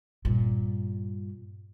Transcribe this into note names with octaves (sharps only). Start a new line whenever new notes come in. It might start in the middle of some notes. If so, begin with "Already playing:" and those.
G2 A#2